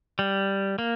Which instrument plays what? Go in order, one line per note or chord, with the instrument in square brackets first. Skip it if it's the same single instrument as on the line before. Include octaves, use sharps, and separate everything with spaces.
[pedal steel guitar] G3
A#3